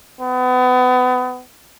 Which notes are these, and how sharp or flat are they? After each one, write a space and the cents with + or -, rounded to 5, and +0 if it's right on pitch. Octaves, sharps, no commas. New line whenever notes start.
B3 +30